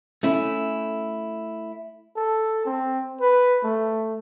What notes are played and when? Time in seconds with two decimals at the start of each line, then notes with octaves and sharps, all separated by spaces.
0.23 A3 C#4 E4
2.16 A4
2.65 C4
3.21 B4
3.64 A3